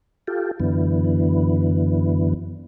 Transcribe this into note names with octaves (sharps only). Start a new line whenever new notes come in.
F4 G4 A4
F#2 D3 E3 B3